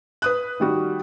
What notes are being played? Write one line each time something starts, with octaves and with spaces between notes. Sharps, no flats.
B4 D#6 F#6
D#3 G3 F#4